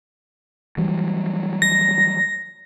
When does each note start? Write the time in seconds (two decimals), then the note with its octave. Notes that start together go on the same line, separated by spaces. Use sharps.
0.77 E3 F#3 G3
1.62 A#6